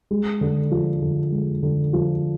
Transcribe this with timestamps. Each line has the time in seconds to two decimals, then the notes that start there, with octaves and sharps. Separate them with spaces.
0.11 G#3
0.41 D3
0.71 F3
1.02 D3
1.32 G#3
1.63 D3
1.93 F3